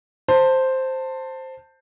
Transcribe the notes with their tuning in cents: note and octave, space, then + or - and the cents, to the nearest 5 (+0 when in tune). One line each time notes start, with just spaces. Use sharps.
C5 +0 A5 +20